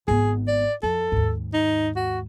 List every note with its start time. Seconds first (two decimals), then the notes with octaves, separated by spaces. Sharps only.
0.08 G#1 B3 G#4
0.48 D5
0.83 F2 A4
1.12 D#2 G#2
1.54 D#4
1.97 F#4